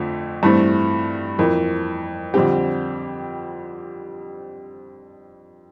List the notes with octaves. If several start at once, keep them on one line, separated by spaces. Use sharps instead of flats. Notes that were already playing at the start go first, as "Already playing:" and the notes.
Already playing: F2 D3 F3 A3
G2 E3 A3 C4
F2 E3 A#3
F2 D3 G3 C4 G4